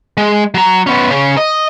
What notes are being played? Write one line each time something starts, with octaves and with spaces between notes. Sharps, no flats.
G#3
F#3 A#5
B3 C#4
C#3 C#4
D#5